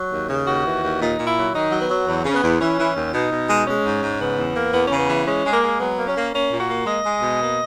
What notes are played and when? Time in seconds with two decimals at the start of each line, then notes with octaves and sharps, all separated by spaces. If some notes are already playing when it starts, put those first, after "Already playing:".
Already playing: F#3
0.11 D#2
0.29 C#3
0.47 D#2 F#4
0.66 E3
0.83 D#2
1.00 A#2 D#4
1.19 A#2
1.26 E4
1.37 F#3
1.54 D#3 D#4
1.71 F#3
1.80 B3
1.90 F#3
2.07 E2
2.25 C#3 C#4
2.34 B3
2.43 E2
2.60 E3 C#4
2.78 E3
2.96 D#2
3.13 B2 D#4
3.31 B2
3.48 G#3
3.66 G#3 C#4
3.84 G#2
4.03 G#2
4.20 C#3 B3
4.37 E2
4.55 A#3
4.73 E2 B3
4.85 C#4
4.91 C#3
4.98 B3
5.08 E3
5.26 G#3 C#4
5.45 G#3
5.53 A#3
5.62 G#3
5.79 F#3 B3
5.97 A#3
6.07 C#4
6.15 A#3
6.33 A#3 C#4
6.51 A#2
6.60 F#4
6.69 A#3
6.86 G#3 D#5
7.04 G#3
7.21 B2
7.40 A#3